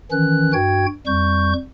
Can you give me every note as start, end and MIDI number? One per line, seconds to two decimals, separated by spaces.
0.11 0.52 51
0.11 0.52 52
0.11 0.52 61
0.11 0.52 90
0.53 0.86 43
0.53 0.86 66
0.53 0.86 79
0.53 0.86 92
1.07 1.53 41
1.07 1.53 55
1.07 1.53 85
1.07 1.53 91